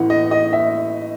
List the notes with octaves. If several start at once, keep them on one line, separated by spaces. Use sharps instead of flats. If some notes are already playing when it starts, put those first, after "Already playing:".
Already playing: A1 A2 E3 F#5
D#5
D#5
E5